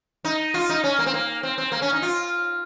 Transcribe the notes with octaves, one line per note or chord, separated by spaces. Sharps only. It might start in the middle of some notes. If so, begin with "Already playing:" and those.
D#4
F4
D#4
C#4
A#3
C4
A#3
C4
C4
A#3
C#4
D#4
F4